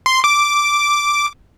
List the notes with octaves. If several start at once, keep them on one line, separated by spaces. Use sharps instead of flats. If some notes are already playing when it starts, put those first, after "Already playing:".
C6
D6